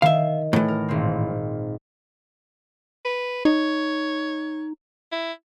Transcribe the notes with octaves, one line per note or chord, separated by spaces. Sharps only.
D#3 E5 F5
A2 E3
A#4
G#1 A#2 C4
B4
D#4 C#5
E4